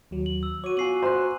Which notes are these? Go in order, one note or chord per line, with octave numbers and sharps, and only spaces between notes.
D#2 F#3
F#7
E6
F#4 C#5 D6 D#7
B3 F4 G#5 C7 F#7
C5 A#5 F#6